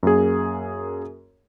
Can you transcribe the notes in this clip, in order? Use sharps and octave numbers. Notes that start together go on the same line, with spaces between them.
F#2 A#3 G#4